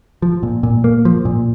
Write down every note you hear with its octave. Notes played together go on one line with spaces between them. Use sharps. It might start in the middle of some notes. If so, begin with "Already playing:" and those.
F3
A#2
A#2
A#3
F3
A#2